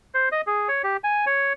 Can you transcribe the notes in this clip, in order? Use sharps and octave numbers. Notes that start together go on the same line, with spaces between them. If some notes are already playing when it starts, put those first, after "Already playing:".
C5
D#5
G#4
C#5
G4
G#5
C#5